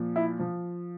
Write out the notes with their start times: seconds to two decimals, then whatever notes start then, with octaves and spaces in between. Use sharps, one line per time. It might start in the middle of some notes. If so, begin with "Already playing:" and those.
Already playing: A#2 F3
0.16 E4
0.39 F3